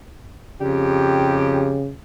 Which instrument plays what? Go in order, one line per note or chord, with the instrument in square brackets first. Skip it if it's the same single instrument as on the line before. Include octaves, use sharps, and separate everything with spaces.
[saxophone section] F2 G4 [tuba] C#3